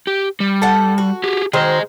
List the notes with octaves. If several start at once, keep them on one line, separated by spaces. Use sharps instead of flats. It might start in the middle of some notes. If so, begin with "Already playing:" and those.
G4
G3
A4 F#5
F#4
G4 G#4
D#3 F#3 G#4 C5 D#5